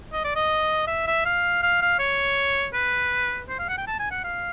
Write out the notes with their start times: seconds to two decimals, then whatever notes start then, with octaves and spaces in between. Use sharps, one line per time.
0.13 D#5
0.24 D5
0.35 D#5
0.87 E5
1.07 E5
1.25 F5
1.63 F5
1.81 F5
1.99 C#5
2.74 B4
3.49 C5
3.59 F5
3.68 F#5
3.77 G5
3.87 A5
3.99 G#5
4.11 F#5
4.24 F5